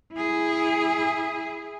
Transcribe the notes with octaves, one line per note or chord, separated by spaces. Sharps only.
E4 G#4